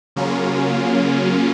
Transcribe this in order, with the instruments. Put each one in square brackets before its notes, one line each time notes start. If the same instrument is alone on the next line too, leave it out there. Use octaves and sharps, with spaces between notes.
[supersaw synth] C#3 F#3 A#3 C#4 F4